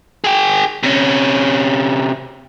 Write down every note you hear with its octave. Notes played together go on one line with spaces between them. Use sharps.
G#4 G5
C3 C#4